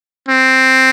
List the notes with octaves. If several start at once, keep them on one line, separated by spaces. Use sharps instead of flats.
C4